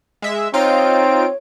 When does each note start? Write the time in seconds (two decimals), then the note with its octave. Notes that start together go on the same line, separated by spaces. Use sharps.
0.22 G#3 E5
0.54 C4 D#4 F4 C#5 D7